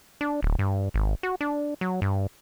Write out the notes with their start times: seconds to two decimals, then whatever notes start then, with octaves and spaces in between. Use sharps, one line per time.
0.21 D4
0.43 D1
0.59 G2
0.94 G#1
1.23 F#4
1.41 D4
1.81 F#3
2.02 G2